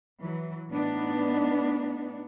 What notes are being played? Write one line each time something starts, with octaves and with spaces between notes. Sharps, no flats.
E3 F#3
A2 B3 D4 D#4